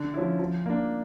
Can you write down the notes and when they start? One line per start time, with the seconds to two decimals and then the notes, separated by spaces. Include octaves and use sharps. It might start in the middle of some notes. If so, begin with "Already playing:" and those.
Already playing: D3
0.14 F3 C#4 E4
0.39 F3
0.66 A#3 D4